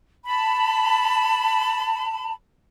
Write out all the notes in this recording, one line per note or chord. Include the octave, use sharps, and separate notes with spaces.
A5 B5